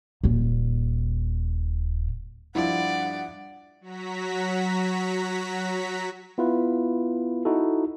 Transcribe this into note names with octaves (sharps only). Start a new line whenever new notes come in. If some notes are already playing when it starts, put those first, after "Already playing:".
D#1 A#2
G2 F3 E4 D5 F#5
F#3 F#4 A#5 B6
B3 E4 F4 B4
D#4 E4 F#4 A4